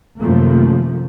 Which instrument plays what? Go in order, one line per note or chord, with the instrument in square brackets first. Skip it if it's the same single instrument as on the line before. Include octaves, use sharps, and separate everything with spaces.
[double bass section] F#2 C3 D#3 F3 A3 A#3